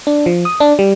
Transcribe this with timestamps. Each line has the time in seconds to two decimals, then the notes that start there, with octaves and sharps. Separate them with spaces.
0.07 D4
0.26 F3
0.45 D#6
0.60 D4
0.79 G3